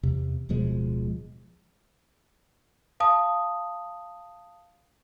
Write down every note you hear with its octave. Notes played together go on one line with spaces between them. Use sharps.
E2 C3
D1 B2 F3 G#3
F5 A5 D#6